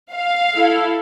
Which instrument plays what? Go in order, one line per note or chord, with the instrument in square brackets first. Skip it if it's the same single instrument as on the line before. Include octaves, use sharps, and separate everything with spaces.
[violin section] F5
[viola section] E4 A4